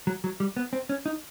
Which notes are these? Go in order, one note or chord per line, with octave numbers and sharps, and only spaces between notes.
F#3
F#3
G3
B3
C4
C#4
D#4